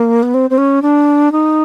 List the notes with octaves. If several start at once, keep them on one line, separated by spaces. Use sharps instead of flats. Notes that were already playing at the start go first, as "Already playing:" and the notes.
Already playing: A#3
B3
C4
C4
C#4
D4
D#4